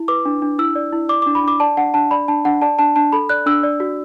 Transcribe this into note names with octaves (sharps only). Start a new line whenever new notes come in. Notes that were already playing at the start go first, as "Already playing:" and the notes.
Already playing: E4
B4 D6
D4
D4
E4 E6
D5
E4
D5 D6
D4 D6
B5
D4 D6
D5 A5
D4 F#5
D4 A5
D5 B5
D4 A5
D4 F#5
D5 A5
D4 A5
D4 A5
A4 B5
D5 F#6
D4 E6
D5
F#4